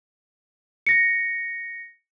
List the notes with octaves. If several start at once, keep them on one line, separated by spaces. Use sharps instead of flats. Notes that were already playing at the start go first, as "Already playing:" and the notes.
A#6 C#7